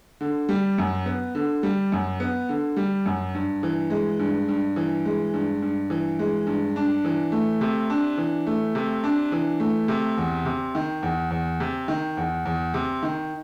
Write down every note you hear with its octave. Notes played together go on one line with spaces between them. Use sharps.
D3
G3
F#2
B3
D3
G3
F#2
B3
D3
G3
F#2
G2
E3
G#3
G2
G2
E3
G#3
G2
G2
E3
G#3
G2
D4
E3
A3
C3
D4
E3
A3
C3
D4
E3
A3
C3
E2
C3
D#3
E2
E2
C3
D#3
E2
E2
C3
D#3